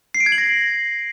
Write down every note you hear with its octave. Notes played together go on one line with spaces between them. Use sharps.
C7
D7
G#6
F#7
A#6